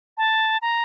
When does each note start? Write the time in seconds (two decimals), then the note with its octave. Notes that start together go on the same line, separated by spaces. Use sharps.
0.18 A5
0.62 A#5